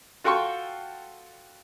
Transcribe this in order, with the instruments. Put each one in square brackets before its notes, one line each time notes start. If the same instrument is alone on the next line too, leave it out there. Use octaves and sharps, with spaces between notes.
[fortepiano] F4 F#4 A4 G5 C6 C#6